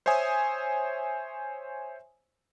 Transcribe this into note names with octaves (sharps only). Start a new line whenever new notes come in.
C5 C#5 E5 G#5 D#6